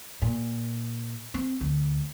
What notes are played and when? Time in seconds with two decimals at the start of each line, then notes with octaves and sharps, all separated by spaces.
0.22 A#2
1.34 C4
1.61 D2